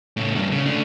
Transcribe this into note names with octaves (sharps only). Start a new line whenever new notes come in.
A2 C#3
D2 G2
C#3
A3 D4